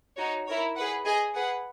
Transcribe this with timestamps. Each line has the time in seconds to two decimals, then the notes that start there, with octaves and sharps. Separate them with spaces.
0.18 D#4 F#4 C#5
0.47 E4 A#4 C#5
0.76 G#4 B4 F#5
1.05 G#4 D#5 G#5
1.34 G#4 B4 F#5